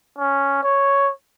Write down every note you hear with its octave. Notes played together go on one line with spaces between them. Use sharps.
C#4
C#5